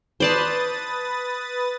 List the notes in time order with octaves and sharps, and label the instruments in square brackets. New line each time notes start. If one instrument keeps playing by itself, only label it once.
[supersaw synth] B4 D#6 A6 [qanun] C5 D5 A5